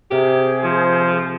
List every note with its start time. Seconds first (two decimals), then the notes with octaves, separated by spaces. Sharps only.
0.11 C3 G4 G#4 A#4 G5
0.64 F3 C5